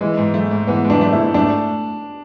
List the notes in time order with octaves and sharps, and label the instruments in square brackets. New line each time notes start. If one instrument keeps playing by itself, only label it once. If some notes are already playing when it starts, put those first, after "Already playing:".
[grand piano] E3 [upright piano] G#3
[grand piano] G#2
A3
G#2
[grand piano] E3 [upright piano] B3
[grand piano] G#2
[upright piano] D4
[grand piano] A3
[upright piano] E4
[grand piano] G#2
[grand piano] A3 [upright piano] D4